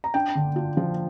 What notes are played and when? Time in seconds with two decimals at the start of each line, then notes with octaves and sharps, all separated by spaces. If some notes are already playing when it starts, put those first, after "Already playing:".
0.04 A#5
0.14 D4 G5
0.35 D3
0.56 F4
0.77 F3